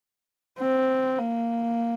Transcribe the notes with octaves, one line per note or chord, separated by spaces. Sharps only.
C4
A#3